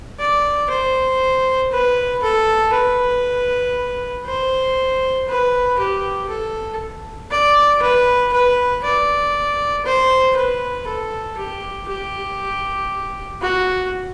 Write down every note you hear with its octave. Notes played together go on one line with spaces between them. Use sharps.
D5
C5
B4
A4
B4
C5
B4
G4
A4
D5
B4
B4
D5
C5
B4
A4
G4
G4
F#4